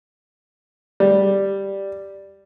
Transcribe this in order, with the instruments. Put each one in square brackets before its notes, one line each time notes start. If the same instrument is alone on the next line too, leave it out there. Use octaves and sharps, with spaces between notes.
[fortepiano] G3